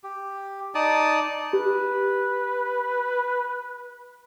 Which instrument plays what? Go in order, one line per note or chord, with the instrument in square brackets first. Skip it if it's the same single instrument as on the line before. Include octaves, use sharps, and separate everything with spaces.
[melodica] G4
D#4 D5 A5 D#6
[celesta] G4 [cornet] B4